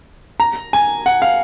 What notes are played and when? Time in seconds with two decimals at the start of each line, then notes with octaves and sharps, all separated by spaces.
0.40 A#5
0.73 G#5
1.06 F#5
1.22 F5